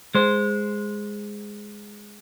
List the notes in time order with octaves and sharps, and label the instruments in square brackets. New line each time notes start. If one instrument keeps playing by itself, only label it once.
[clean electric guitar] G#3 C5